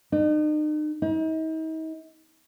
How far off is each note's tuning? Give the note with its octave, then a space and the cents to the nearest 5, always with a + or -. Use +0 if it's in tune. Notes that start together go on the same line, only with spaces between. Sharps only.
D#4 -40
D#4 +40